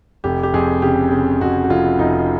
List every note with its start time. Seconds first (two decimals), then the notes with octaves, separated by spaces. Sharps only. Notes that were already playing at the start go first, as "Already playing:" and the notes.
0.24 F1 G4
0.43 G4
0.54 F2 G#4
0.82 C#3 G4
1.11 C#3
1.41 F2 F#4
1.64 F#4
1.70 F1 F4
1.99 F1 D#4